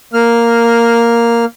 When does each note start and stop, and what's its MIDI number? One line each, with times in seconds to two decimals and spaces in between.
0.13 1.45 58
0.13 1.45 89